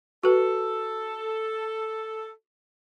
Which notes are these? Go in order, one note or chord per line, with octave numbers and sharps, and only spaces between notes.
F#4 A4 B4